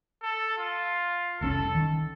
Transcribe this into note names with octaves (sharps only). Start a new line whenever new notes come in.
A4
F4
F1 C2 C#4 A4
D#3